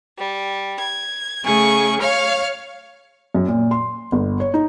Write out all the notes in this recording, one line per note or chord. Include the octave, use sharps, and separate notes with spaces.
G3
G#6
C#3 A3 G#4 C#6
C#5 F5 C#6 F6
F#2
A#2
C6
G1
C#5
D#4